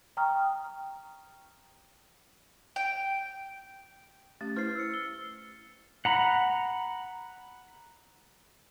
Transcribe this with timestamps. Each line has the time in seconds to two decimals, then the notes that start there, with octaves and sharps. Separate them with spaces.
0.17 G5 A#5 C#6 D#6 F6
2.76 G5
4.41 A3 C#4 G4 A6
4.56 E4 B4 C5 F6 C7
4.76 E6 C#7
4.94 G7
6.05 F#5 A#5 B5